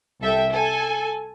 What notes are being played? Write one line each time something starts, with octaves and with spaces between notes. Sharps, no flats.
C2 A4 E5 G5
A4 G#5